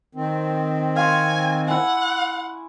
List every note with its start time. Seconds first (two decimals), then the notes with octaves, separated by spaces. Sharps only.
0.15 D#3 C4
0.96 F5 G#5 C6 C#6
1.68 E4 F#5 G#5